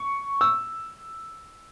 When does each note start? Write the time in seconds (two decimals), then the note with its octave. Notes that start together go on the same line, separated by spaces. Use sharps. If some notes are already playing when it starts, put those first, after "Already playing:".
Already playing: C#6
0.41 E6